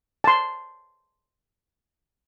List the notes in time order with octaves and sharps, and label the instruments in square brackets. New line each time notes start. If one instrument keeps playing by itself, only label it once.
[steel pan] A5 C6